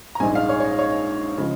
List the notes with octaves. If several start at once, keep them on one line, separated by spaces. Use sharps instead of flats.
A#5
A#1 G#2 G#3 G#5
F5
C#5
C#5
D#5
C#5
C#3 F3 G#3